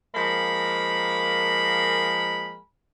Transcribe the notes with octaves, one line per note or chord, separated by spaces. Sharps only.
F3 G#3 A#3 A#4 B5